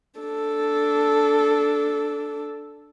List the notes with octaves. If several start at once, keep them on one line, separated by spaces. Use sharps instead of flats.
D4 A4